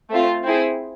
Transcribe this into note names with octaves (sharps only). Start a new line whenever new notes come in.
A3 C4 F4
C4 E4 G#4